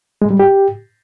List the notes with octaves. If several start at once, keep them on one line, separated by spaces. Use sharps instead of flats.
G#3
G3
G4